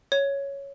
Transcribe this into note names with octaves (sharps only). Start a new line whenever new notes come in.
C#5